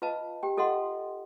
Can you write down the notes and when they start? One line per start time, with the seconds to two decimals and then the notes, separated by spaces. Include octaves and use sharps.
0.02 F4 B4 D#5 F5 A5
0.43 G4 G5
0.57 F4 A4 D#5 F5 F#5 C6